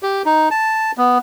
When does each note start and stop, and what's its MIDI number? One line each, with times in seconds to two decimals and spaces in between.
0.03 0.22 67
0.26 0.49 63
0.51 0.91 81
0.98 1.18 59